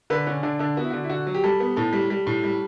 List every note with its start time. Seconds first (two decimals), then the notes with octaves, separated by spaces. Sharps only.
0.10 D3 B4
0.26 D3 C#4
0.43 D3 D4
0.59 D3 D4
0.77 B3 F#4
0.84 E4
0.90 D3 F#4
1.04 E4
1.09 D3 F#4
1.27 F#3
1.34 G4
1.44 G3 A4
1.60 B3
1.76 A2 A4
1.93 G3
2.10 G3
2.27 A2
2.44 G3